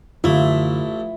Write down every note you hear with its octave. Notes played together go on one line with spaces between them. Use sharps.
A1 F#2 D3 E3 A3 E4 F4